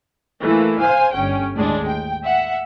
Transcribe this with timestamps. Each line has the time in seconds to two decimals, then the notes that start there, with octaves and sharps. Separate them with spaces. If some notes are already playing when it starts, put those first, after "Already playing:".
0.42 E3 A3 A#3
0.80 C5 F5 G#5
1.14 G1 C#4 G5
1.55 D#2 A2 G#3 D4
1.87 G5
2.24 E5 F#5